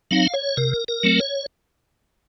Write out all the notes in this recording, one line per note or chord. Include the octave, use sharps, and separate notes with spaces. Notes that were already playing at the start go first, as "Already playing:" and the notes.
F#3 C4 D#4 F5
C#5
C3 A#4
A#4
F#3 A3 C4
C#5